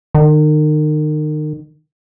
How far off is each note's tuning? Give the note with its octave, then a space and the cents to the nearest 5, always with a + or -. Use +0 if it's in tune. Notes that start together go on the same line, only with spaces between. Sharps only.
D#3 -35